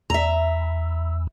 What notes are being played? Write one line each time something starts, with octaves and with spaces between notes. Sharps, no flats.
E2 E5 A#5